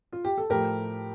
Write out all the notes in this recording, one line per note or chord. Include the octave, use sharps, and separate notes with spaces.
F4
G4
A4
A2 F3 A3 G4 A#4